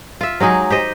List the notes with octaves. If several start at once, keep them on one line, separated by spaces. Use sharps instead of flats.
F4 E5
F#3 G#3 D#4 G#4
G4 C5 D#5